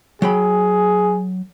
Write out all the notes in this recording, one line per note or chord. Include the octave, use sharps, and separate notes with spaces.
F#3 G#4 G5 B5